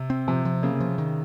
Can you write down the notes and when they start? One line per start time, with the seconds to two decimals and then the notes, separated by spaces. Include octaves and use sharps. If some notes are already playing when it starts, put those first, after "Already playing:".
Already playing: C3
0.10 C4
0.28 C3 F3
0.45 F3
0.63 C#3 A#3
0.80 F3
0.98 D#3